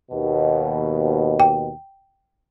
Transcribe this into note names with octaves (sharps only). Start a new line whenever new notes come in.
D#2 B2
G5